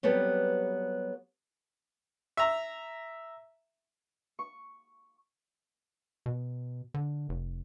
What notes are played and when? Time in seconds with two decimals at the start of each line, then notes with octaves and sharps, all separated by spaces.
0.03 F#3 G3 B3 C4 G4 A4
2.37 E5 A#5
4.39 C#6
6.26 B2
6.94 D3
7.29 F1